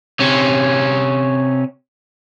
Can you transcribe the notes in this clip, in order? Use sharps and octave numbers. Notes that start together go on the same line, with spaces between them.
C3 C#4